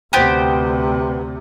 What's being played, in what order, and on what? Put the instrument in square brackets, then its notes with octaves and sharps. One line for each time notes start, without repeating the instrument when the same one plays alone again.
[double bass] D2 C3 [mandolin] B3 G4 C5